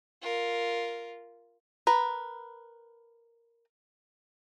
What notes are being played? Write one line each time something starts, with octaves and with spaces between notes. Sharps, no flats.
F4 A#4
A#4 B4